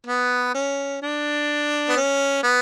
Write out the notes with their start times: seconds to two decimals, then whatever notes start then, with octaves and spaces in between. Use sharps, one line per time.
0.07 B3
0.55 C#4
1.02 D4
1.89 B3
1.97 C#4
2.43 B3